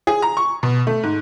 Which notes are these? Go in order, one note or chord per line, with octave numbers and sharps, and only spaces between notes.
G#4
A#5
C#6
B2
A3
G#2